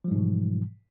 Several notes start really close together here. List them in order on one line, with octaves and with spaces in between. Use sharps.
F3 G3 G#2 B2 E3